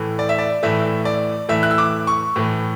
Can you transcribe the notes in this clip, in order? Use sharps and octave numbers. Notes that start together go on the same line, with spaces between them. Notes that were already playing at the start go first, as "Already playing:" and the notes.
Already playing: A2 E3 A3
D5
E5
D5
A2 E3 A3 E5
D5
A2 E3 A3 E5
F#6
E6
D6
C#6
A2 E3 A3